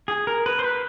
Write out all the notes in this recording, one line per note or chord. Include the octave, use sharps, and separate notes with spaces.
G#4
A#4
B4
C5
B4